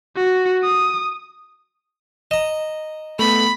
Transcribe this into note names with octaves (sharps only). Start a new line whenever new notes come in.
F#4
D#6
D#5 A#5 E7
A3 B3 B5